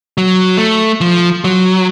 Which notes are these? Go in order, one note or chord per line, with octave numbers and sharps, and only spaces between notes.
F#3
A3
F3
F#3